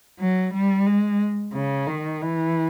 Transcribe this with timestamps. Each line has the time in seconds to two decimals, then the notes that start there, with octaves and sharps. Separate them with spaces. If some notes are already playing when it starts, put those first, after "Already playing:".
0.20 F#3
0.54 G3
0.87 G#3
1.54 C#3
1.87 D#3
2.21 E3